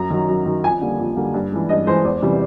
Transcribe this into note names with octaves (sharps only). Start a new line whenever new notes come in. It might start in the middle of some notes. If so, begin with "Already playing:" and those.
Already playing: F#2 A#5
D#3 F#3
F#2
D#3 F#3
F2 G#5
D3 G3 A#3
F2
D3 G3 A#3
G2
E3 G#3
G2 D#5
E3 G#3 C5
E2
C3 E3 G3